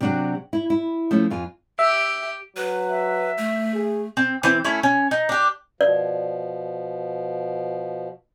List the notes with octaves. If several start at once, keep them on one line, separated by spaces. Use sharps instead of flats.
C3 F#3 D4 F#4 G4
E4
E4
F3 A3 C#4
F2 F4 G#5
G4 E5
F#3 B4
E5
A3
G#4
C4
E3 C4
A3 C#4 E4
C#4
D#4
D4 G4
B2 F3 D5